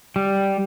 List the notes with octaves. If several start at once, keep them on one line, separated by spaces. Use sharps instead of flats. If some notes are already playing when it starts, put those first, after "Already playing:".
G3